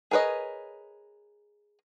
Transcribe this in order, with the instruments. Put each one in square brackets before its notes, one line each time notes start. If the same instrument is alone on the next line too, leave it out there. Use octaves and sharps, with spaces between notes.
[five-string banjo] G#4 A#4 B4 C#5 D#5